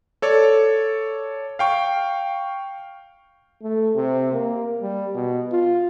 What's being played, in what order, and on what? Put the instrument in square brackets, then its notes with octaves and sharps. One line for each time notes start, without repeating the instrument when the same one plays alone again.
[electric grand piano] A4 C#5 D5
F5 G5 C#6
[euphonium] A3
C3
A#3
G3
B2
F4